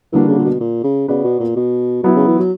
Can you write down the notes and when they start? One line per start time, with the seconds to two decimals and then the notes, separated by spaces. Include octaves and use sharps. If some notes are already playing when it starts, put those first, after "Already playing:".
0.13 D3 E3 G3 A#3 D4 F#4
0.28 C#3
0.38 A#2
0.45 B2
0.60 A#2
0.84 C#3
1.08 C#3 B3 F#4 B4 D5
1.24 B2
1.40 A#2
1.56 B2
2.03 B2 F#3 B3 E4
2.16 C#3
2.28 E3
2.39 F#3